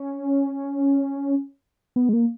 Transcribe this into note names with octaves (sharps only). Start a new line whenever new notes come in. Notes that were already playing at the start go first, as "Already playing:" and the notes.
Already playing: C#4
B3
G#3
A#3